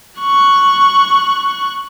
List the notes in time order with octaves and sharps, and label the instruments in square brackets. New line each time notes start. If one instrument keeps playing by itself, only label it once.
[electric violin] C#6 F#6